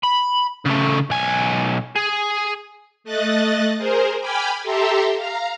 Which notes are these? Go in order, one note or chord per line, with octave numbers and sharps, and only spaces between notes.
B5
C#3 A3
B1 G#5
G#4
A3 D#5 F#6 A6
G#4 A#4 C5
G5 G#5 B5 D6 F6 G#6
G4 A4 E5 A#5 C6
F5 A#5